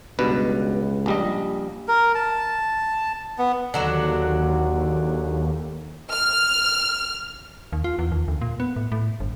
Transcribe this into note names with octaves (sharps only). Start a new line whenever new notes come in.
C#2 G2 B2 B4
A#1 G3 D#5
A#4
A5
B3
D#2 D3 F#3 F#4
F6
D#2
F4
E2
D#2
D2
A#2
B3
A2
A2
G1